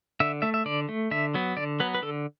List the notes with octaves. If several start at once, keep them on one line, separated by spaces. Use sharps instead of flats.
D3 E5
A3 E5
E5
D3 D5
A3
D3 E5
F#3 B3
D3 D5
F#3 B3 B4
B4
D3 A4